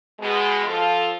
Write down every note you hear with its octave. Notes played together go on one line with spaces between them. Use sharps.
B2 G#3
F3 F4 A4